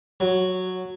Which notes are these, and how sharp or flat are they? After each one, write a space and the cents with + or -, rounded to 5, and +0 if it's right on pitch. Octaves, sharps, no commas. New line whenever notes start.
F#3 -5